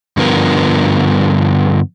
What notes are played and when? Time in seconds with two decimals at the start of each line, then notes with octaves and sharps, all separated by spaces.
0.17 G2 D3 F3 B3 A#4